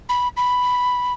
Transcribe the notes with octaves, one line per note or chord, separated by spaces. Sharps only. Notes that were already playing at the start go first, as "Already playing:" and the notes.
B5
B5